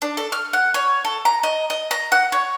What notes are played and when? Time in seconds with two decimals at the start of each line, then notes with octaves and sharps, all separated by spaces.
0.02 D4
0.17 A4
0.32 F6
0.53 F#5
0.74 C#5
1.05 A4
1.25 A#5
1.43 D#5
1.70 D#5
1.91 A#5
2.12 F#5
2.32 C#5